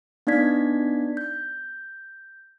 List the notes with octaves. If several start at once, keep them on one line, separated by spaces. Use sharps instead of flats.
B3 D4 D#4 D5 G#6 B6
G6